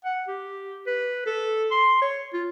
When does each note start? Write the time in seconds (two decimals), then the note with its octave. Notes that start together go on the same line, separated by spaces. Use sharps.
0.05 F#5
0.28 G4
0.87 B4
1.26 A4
1.71 C6
2.02 C#5
2.34 F4